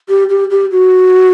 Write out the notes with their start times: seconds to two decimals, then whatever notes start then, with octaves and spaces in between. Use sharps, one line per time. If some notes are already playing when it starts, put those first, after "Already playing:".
0.09 G4
0.29 G4
0.50 G4
0.71 F#4